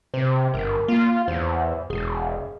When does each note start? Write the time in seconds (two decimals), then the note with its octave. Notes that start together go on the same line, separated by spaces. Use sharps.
0.14 C3 C5
0.54 G1 A#4
0.88 A#3 F4
1.28 E2 C5
1.90 E1 G#4